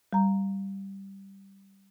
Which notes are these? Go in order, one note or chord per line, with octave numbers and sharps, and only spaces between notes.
G3 A#5